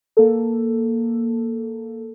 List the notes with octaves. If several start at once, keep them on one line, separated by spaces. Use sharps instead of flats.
A#3 A4